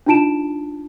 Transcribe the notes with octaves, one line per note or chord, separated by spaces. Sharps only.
D4 D#4 F4 A5 D7 E7